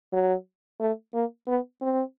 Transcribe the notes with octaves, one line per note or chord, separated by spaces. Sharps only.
F#3
A3
A#3
B3
C4